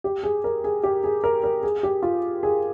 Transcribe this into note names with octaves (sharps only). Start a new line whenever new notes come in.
G4
G#4
A#4
G#4
G4
G#4
A#4
A#4
G#4
G4
F4
G#4